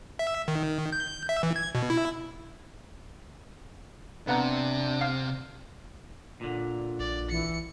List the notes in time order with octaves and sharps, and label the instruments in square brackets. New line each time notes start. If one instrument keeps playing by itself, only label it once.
[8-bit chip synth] E5
D#3
G6
E5
E3
G#6
B2
E4
[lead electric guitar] C3 [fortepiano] B3 F#5 A#5 [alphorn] D4
[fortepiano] F5
[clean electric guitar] A#2 D3
[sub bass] A#1 [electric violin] D5
[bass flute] E3 [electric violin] C#7